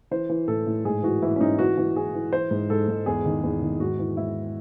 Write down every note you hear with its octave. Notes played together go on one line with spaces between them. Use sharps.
E3 C5
E3
A2 A4
A2
G#2 G#4
E3 F#4
E3 E4
C#4
G#2 D#4
E3 F#4
E3
E3 G#4
E3
E3 C5
G#2
G#2 A4
G#2
E2 G#4
D#3
E2
D#3
G#2 F#4
E3
G#2 E4